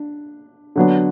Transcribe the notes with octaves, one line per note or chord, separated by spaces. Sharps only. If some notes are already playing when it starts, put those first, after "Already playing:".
Already playing: D4
D3 F#3 B3 D4